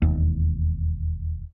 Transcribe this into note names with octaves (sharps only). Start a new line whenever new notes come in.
E1 D#2